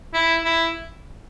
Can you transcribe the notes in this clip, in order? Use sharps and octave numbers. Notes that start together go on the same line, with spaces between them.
E4
E4